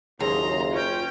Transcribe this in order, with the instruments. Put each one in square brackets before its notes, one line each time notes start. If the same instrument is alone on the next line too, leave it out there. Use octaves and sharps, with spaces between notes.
[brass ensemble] F#1 [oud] D#2 [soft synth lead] G#4 [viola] A#5 C6
[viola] C#4 G5 [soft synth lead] F4